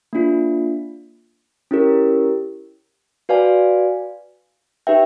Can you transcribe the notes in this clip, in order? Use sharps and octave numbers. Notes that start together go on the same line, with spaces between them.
A#3 D4 F4
C#4 E4 G4 A#4
F#4 B4 D5 F5 G#5
D#4 G4 B4 E5 G5